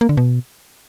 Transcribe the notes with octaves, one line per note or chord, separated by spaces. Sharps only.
A#3
D3
B2